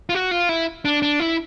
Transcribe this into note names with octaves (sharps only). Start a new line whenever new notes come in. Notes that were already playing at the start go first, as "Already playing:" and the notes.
F4
F#4
F4
E4
D4
D4
E4